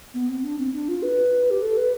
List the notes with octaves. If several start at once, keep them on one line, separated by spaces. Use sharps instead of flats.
B3
C4
D4
C4
D4
F4
B4
G4
A4
B4